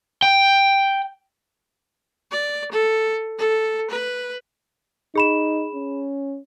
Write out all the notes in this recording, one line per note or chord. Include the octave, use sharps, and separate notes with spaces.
G5
D5
A4
A4
B4
D#4 G#4 B5 E7
C#4